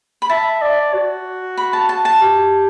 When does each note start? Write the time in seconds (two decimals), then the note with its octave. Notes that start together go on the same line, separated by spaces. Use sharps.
0.22 B5
0.30 E5 A5
0.62 D5
0.94 F#4
1.57 B5
1.73 A5
1.89 A5
2.05 A5
2.21 G4